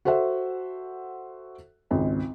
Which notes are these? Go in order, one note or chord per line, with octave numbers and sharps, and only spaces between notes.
F#4 A4 C5 E5 F#5
G#1 C#2